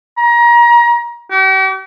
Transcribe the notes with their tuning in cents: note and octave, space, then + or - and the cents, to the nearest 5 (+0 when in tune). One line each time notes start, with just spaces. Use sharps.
A#5 +30
G4 -45